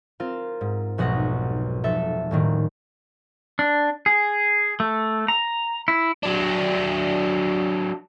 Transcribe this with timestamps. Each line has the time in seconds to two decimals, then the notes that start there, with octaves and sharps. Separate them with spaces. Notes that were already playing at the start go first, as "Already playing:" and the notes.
0.20 C4 F4 A#4
0.61 G#2
0.98 F1 B1 B2 F#5 A#6
1.84 F1 A4 E5
2.31 D#1 A2 D#3 A#3
3.59 D4
4.06 G#4
4.80 A3
5.28 A#5
5.88 E4
6.23 F#3 D4